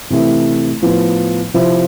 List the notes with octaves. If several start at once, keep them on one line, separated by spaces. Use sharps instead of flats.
C3 E3 A3 E4
A2 F3 B3
C3 F3 C4 E4